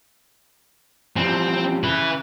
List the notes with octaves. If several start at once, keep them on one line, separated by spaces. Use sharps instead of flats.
E3 F3 G3 C4
C#3 E4 B4